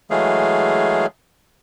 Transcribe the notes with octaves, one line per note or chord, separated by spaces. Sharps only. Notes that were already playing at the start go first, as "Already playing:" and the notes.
E3 F#3 G#3 A3 G#4 F5